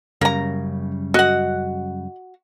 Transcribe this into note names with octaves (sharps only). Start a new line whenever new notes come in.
F#2 C#3 G3 A#3 A#5
F#4 D#5 F#5